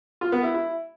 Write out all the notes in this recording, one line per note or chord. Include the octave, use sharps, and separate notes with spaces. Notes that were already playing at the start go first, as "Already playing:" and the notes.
F4
B3
E4
E4